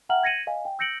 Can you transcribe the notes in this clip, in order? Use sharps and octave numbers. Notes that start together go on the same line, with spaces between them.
E5 F#5 G5 A#5 F6 F#7
G#6 A#6 C#7 D#7 F#7
D#5 F5 G#5
G5
E6 G6 A#6 C#7 D7 F#7